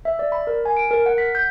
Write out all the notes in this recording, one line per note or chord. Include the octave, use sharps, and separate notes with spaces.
E5
D5
B5
A#4
G#5
D7
A#4
F#5
B6
G6